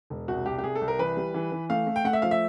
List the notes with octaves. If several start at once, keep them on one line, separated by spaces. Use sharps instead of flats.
E1
C2 F#4
C2 G4
G4
C2 G#4
A4
C2
A#4
E3 B4
G3
E3
E3
A3 F5
A3
G5
A3 F#5
E5
F3 F5
E5